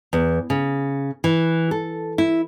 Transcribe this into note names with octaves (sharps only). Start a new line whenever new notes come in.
E2
C#3
E3
A4
E4